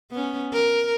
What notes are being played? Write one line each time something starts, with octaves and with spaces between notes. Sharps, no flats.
B3 C#4
A#4